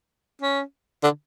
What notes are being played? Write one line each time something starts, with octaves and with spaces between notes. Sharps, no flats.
C#4
D3